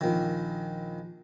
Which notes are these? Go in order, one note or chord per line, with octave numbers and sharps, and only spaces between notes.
A#1 D#3